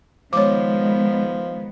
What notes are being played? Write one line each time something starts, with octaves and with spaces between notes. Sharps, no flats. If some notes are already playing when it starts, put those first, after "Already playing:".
D#3 F3 G#3 B3 C#5 D6